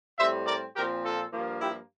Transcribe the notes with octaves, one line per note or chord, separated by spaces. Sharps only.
A2 G3 C4 C5 E5
A#4 D5
A#2 F3 C4 G4 A#4
F4 A4
G2 F3 A#3
E4 G4